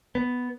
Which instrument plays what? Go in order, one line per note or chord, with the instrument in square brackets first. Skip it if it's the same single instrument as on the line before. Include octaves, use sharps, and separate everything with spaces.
[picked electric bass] B3